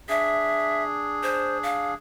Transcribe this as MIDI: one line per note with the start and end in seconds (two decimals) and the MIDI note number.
0.09 1.94 62
0.09 1.94 68
0.09 0.83 76
1.23 1.58 72
1.63 1.92 77